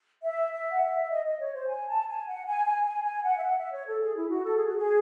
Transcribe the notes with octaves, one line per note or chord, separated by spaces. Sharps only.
E5
E5
F#5
E5
D#5
D#5
C#5
C5
G#5
A5
G#5
F#5
G#5
G#5
G#5
G#5
F#5
E5
F#5
E5
C#5
A4
G#4
E4
F#4
A4
G#4
F#4
G#4